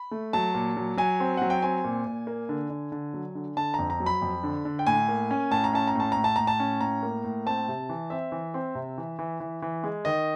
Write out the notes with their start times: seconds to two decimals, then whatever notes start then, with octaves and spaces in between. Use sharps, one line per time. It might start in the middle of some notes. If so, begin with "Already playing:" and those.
Already playing: B5
0.11 A3
0.33 F#3 A5
0.55 A#2
0.77 F#3
0.97 F#3 G#5
1.20 C4
1.37 F#3 F#5
1.50 G5
1.62 C4 G#5
1.84 A#2
2.06 A#2
2.27 A#3
2.49 D3
2.70 D3
2.92 D3
3.14 F#3
3.35 D3
3.57 D3 A5
3.74 A#5
3.79 F2
3.90 A#5
4.00 F#3
4.06 B5
4.22 F2
4.43 D3
4.65 D3
4.79 G5
4.87 A2 G#5
5.09 A#3
5.31 C#4
5.51 A2 A5
5.64 A#5
5.73 C#4 A5
5.87 A#5
5.95 A2 A5
6.12 A2 A#5
6.24 A5
6.36 A2 A#5
6.47 A5
6.60 C#4
6.81 A2 A#5
7.03 A#3
7.25 A2
7.46 C4 A5
7.68 C3
7.89 E3
8.10 C4 E5
8.32 E3
8.54 C4
8.75 C3
8.98 E3
9.19 E3
9.40 E3
9.62 E3
9.84 G#3
10.05 D#3 D#5